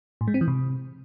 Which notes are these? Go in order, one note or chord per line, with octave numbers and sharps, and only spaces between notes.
A2
G#3
C4
E3
C3